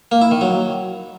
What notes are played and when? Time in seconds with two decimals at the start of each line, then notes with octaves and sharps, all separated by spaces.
0.12 A#3
0.21 E4
0.31 D#3
0.41 F#3